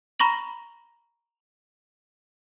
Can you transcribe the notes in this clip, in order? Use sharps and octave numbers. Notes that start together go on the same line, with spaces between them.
A#5 B5 C#6 A#6 F#7